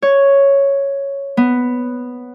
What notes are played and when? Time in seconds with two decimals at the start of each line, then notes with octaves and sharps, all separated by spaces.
0.02 C#5
1.37 B3